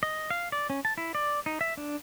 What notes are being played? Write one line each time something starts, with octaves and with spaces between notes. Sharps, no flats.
D#5
F5
D5
C#4
A5
E4
D5
D#4
E5
D4